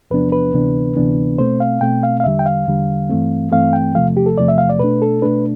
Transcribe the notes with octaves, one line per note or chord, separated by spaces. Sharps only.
E2 C3 F3 B3 D4 B4
B4
D2 C3 E3 B3 D4
D2 C3 E3 B3 D4
B2 A3 C4 C5
F5
B2 A3 C4 G5
F5
F5
E2 D3 G3 E5
G5
F5
E2 D3 G3
G2 E3 A3 C4
G2 E3 A3 C4 F5
G5
E2 C3 F3 A3 F5
G4
A4
E2 C3 F3 A3 D5
E5
F5
D5
B2 A3 D4 B4
A4
B2 A3 D4 B4